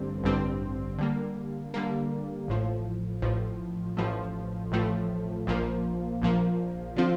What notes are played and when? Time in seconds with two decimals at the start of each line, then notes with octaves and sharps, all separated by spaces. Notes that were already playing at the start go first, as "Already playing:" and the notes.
Already playing: A1 G2 D3 G3 C4
0.24 A1 G2 D3 G3 C4
0.99 D3 G3 A#3
1.74 D3 G3 A#3
2.48 A1 A2 F3
3.22 A1 A2 F3
3.97 A1 A2 F3 A3
4.72 A1 A2 F3 A3
5.47 A#1 A#2 F3 A#3
6.22 A#1 A#2 F3 A#3
6.96 D3 F3 C4 F4